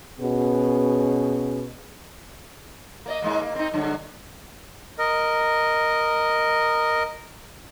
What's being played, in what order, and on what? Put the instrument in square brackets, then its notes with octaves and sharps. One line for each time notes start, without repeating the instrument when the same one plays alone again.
[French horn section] B2 B3 C#4 F#4 G#4
[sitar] A#3 D5 D#5
G#2 G#3 A#3
A#3
C4 D#4
G2 D3 F#3
[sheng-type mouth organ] A#4 D#5